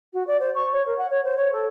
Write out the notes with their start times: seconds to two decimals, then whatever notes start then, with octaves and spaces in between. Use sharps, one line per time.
0.13 F#4
0.27 D5
0.40 C5
0.55 C#6
0.72 C#5
0.86 A#4
0.98 F#5
1.10 C#5
1.24 C5
1.37 C#5
1.52 A4